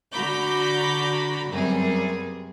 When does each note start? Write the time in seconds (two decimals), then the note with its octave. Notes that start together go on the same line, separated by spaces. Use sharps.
0.12 D3 F#4 A#5 B5 D6 G6
1.51 F#2 C3 G3 A#3 B3 G#4